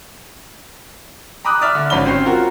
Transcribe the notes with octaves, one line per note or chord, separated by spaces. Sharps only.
A#5 B5 D6 D#6 F#6
D5 E5 F6
D3
G#1 C#4 B5 G7
C4 C#4 C7
F4 F#4 A#4